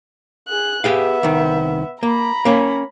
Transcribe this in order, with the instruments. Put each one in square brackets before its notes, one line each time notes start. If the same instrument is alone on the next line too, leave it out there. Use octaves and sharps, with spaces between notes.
[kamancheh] G#4 F#6
[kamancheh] B3 E5 [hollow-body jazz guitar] G4 G#4 F5
[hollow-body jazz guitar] C2 D#3
[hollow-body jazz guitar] A#3 [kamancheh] A#5 B5
[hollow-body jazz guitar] A#3 C#4